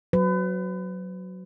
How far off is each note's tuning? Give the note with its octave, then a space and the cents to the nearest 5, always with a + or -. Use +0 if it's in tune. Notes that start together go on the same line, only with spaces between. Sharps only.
F#3 +0 B4 +35